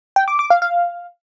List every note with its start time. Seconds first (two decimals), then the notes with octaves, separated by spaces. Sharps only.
0.16 G5
0.28 D6
0.39 D6
0.50 F5
0.62 F5